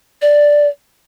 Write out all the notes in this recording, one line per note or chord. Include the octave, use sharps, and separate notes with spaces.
D5